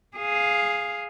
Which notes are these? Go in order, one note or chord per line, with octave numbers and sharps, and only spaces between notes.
G#4 F5